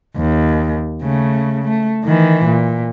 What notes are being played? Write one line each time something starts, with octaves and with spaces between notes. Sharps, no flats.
D#2
C#3 A3
A3
D#3 E3
A#2